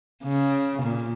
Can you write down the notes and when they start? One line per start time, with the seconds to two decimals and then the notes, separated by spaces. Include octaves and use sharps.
0.24 C#3
0.82 A#2